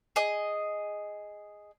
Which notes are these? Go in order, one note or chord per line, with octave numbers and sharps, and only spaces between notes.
G#4 D#5